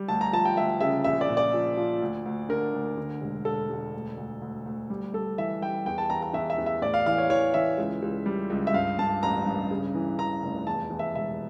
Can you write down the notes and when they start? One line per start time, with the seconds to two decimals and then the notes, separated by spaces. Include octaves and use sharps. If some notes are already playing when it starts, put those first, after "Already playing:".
Already playing: G3
0.08 D2 A5
0.21 A#5
0.33 F3 A5
0.45 G5
0.57 D2 E5
0.81 C#3 E5
1.04 A#1 E5
1.21 D5
1.29 A#2
1.37 D5
1.53 F3
1.77 F3
2.02 D2
2.26 D2
2.49 D3 A#4
2.73 D2
2.97 D3
3.21 E1
3.45 E1 A4
3.69 E1
3.94 D2
4.17 D2
4.41 D2
4.66 D2
4.90 G3
5.14 G3 A4
5.38 E3 E5
5.62 G3 G5
5.86 E2 G5
5.98 A5
6.10 E2 A#5
6.22 A#5
6.33 E2 E5
6.50 E5
6.58 E2
6.66 E5
6.82 A2 D5
6.94 F5
7.06 E3 F5
7.18 C#5
7.30 E3 C#5
7.54 E3 E5
7.78 C#2
8.02 C#2
8.26 G3
8.50 C#2
8.67 E5
8.74 G2 F5
8.99 G2 A5
9.23 A1 A#5
9.46 G2
9.71 C#3
9.95 E3
10.19 E3 A#5
10.42 F1
10.67 E2 A5
10.90 E2
10.99 E5
11.15 E1 E5